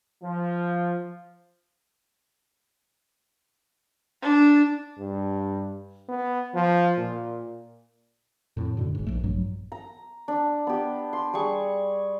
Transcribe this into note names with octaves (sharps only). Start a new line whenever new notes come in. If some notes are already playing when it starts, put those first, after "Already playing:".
F3
D4
G2
B3
F3
A#2
F2 A2
F#2 B2 D3
G#1 G#2
A#1 A3
A#1 G2 A#2 F#3
A#5
D4
B3 G4
C6
G3 G#4 C#6